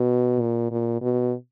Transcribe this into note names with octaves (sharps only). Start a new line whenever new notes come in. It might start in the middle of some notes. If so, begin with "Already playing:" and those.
Already playing: B2
A#2
A#2
B2